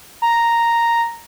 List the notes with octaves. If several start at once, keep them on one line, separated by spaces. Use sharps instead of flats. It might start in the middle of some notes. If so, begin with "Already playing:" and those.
A#5